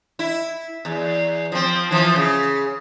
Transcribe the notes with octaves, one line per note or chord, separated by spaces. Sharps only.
E4
E2
F3 C4
E3 F3
C#3